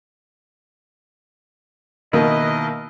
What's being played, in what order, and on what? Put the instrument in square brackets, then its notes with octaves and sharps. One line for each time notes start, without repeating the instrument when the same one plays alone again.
[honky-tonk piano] B2 D#3 [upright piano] A#3 [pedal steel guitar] E4 A#4 B4 [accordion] D#5